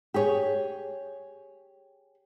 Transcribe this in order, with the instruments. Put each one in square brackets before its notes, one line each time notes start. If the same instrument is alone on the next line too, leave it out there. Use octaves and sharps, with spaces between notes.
[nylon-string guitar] G4 G#4 C#5